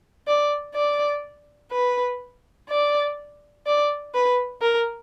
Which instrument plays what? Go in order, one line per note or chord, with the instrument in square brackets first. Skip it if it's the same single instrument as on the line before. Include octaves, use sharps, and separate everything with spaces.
[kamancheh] D5
D5
B4
D5
D5
B4
A#4